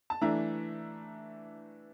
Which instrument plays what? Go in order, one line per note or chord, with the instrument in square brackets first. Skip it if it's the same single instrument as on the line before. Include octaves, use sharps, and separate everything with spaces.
[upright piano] A5
E3 A3 D4 A#5